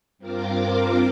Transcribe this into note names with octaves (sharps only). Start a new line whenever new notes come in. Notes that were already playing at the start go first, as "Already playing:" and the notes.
G2 C4 F4 A#4 D6